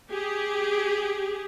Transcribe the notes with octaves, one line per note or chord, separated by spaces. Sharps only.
G4 G#4